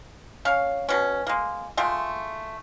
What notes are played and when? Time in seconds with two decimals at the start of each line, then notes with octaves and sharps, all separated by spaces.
0.45 C#4 C#5 F5
0.89 B2 C#4
1.27 G#3 A#3
1.77 G#3 A3 F4 G5